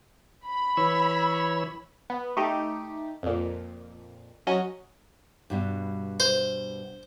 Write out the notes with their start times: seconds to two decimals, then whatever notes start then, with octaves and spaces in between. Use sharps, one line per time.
0.46 B5
0.77 E3 C#5 E6
2.10 B3
2.37 A3 D#4 G4
3.23 F2 A#2
4.47 F#3 C#4 F#4 D#5
5.50 G2 B2 G3
6.20 C5